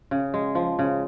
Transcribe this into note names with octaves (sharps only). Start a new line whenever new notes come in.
C#3
G#3
F3
C#3